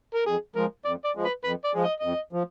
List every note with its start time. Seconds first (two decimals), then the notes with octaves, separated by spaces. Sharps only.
0.14 A#4
0.26 F2 G#4
0.55 F3 G#3 A#4
0.85 F2 D5
1.05 D5
1.15 F3 G#3
1.25 B4
1.44 F2 B4
1.64 D5
1.73 F3 G#3
1.84 D#5
2.00 F2 D#5
2.33 F3